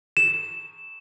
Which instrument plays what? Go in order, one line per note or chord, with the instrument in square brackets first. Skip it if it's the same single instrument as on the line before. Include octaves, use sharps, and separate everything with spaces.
[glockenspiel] E7